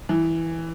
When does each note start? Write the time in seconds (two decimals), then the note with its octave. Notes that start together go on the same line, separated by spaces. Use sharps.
0.09 E3